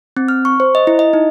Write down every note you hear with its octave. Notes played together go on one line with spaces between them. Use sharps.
C4
F6
C#6
C5
D#5
E4
D#5
D#4